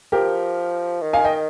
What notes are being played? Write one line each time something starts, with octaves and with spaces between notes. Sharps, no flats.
F3 G4 A#4
D#3
F5 G#5
D#5 G5